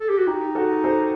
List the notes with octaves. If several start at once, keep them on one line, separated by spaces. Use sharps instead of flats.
A4
G4
F#4
D#4 G4
F#4 A4
A4 C5